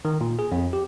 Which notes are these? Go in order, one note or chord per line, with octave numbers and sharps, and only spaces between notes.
D#3
A#2
G#4
F2
G4